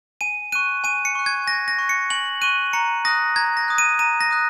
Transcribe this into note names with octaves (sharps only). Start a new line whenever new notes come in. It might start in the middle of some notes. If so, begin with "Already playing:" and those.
G#5 D#7
C#6 F#6 D#7
G#5 D#7
C#7
C#6 F#6
G#6
G#5 A#6
A#6
C#6 F#6
C#7
G#5 F#7
C#6 F#6 D#7
A#5 C#7
D#6 F#6 A#6
A#5 G#6
A#6
D#6 F#6
D#7
A#5 D#7
A#6
D#6 F#6